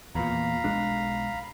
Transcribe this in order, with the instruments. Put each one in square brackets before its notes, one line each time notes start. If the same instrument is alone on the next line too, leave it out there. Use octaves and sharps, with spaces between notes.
[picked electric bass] E2 A#2 [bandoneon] F5 A#5 B5
[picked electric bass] B1 G#3 D4